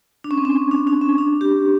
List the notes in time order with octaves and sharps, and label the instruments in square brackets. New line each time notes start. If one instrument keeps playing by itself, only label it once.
[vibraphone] D4
C#4
C4
C#4
D4
D4
C#4
D4
G4